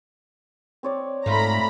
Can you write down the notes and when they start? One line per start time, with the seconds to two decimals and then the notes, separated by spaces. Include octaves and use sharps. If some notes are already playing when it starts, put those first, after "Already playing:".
0.83 C4 C#5 D5
1.26 G#2 A3 F4 A#5 B5